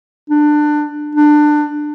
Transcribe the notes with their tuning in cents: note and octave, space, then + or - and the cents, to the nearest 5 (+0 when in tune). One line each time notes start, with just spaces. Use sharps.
D4 +20
D4 +20